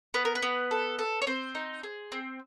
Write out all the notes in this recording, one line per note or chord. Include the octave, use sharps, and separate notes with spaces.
B3 B4
A#4
B4
B3
A4
A4
C#5
C4 C5
D#4
G#4
C4